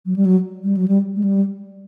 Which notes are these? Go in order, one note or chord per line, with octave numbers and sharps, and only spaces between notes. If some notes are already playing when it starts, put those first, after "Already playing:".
F#3
G3
F#3
G3
F#3
G3
G#3
G3